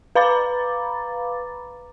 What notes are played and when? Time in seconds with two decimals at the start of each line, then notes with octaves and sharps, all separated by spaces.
0.15 B4 F5 A#5 B5 D6 A6